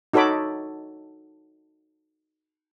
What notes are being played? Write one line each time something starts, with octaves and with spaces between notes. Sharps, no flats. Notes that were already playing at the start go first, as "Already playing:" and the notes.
D#4 F#4 A4 C#5 B5 D6